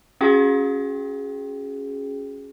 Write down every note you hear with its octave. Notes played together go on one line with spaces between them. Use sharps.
C#4 F#4 G#4 G5